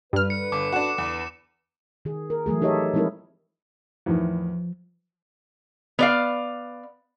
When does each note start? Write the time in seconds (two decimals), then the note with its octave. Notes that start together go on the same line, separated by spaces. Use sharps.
0.13 G2 D3 B4 F6
0.30 C#7
0.52 G1 D6
0.73 D4 F#4 E7
0.98 E2
2.05 D#3 G#4
2.30 A#4
2.46 E3 F#3 A3 G#4
2.62 D#4 G4 A4 C#5 D#5 E5
2.94 F3 G#3 C4 D#4 E4 A#4
4.06 E2 A2 D#3 F3
5.99 B3 D5 F5